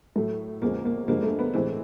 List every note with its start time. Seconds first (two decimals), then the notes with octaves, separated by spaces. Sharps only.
0.16 A2 F#3 A3
0.62 E2 C#3 F3 G#3 A#3
0.85 A#3
1.08 G2 D3 F3 G#3 A#3
1.23 A3
1.39 B3
1.54 A2 E3 G#3 C4